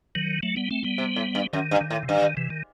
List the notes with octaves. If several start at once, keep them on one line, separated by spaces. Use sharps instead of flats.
D#3 F#3
F#3 A3
G3 B3
A3 C4
G3 B3
C3
A2
G2
F#2 D#3
G2
D#3
A2
C3
G2 D#3
D#3
C3 E3
D#3